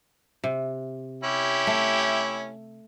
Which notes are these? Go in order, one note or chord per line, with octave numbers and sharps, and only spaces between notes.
C3
C#4 E4 G4
A3